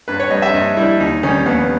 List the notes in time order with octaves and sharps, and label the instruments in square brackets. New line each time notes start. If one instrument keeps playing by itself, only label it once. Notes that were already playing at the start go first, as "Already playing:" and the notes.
[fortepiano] G2 B4
C#5
G3 D#5
E5
G2 D#5
G3 E4
D#2 D#4
D#3 G3 C#4
D#2 B3